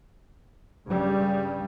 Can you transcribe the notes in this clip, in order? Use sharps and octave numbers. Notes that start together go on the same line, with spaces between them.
G2 C#3 G3